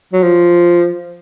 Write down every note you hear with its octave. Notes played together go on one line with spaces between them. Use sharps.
F#3
F3